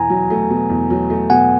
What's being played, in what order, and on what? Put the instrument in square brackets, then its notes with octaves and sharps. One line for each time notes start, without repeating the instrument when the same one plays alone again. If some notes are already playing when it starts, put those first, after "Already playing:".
Already playing: [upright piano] E2 B2 [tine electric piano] G#5 A#5
[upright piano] F#3
A3
B2
E2
F#3
A3
[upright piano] B2 [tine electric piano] F#5 G#5